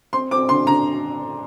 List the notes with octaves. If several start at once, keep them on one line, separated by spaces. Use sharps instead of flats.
C4 C6
C4 D6
D3 C6
D3 A#5